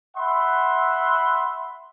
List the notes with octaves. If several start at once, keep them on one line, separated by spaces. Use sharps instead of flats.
E5 F#5 B5 C6